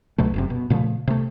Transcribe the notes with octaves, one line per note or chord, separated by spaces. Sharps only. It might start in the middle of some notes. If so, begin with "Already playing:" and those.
C#2 B2 F#3 A3
F#1 F#2 C3
B2
A#2 C#3 F3 A3
C3 A3